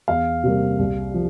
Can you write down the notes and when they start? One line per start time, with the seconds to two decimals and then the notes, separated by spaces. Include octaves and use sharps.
0.08 E2 F5
0.43 C3 G3 A#3
0.79 C2
1.14 F3